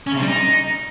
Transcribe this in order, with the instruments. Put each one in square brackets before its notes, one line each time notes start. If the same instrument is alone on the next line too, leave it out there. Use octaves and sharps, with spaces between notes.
[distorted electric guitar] C#4
C#3
C3
G3
D#4